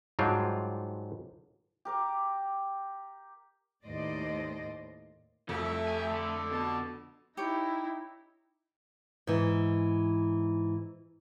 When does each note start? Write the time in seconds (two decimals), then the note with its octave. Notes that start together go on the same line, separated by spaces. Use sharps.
0.19 G#2 F#3 G3 D4 F4 G5
1.85 G4 A#4 D6
3.85 D#2 A2 C5 D5 D#5
5.49 C2 F2 A3 G4
5.64 E5
5.88 G4 G#5
6.11 D3
6.52 B2 A5
7.37 D#4 E4 G4 C#5 D6
9.27 G#2 E3